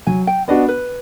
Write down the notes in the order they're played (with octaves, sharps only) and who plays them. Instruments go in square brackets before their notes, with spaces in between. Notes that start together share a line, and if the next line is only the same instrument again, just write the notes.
[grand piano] F#3 [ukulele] G#5
[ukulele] G5
[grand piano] B3 D4 F#4 [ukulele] D#5
[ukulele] B4